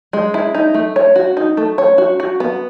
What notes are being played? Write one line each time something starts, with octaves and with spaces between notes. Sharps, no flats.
G#3
E4
D#4
A3
C#5
F#4
D#4
A3
C#5
F#4
F#4
B3